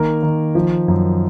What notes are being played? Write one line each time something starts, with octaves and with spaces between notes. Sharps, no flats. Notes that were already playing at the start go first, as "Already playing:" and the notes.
Already playing: D#3 A#3 A#4
D#3
F3
F#2